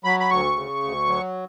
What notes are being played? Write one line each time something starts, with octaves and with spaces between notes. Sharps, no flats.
F#3 B5
B5
D2 C#6
C#3
D2
F#3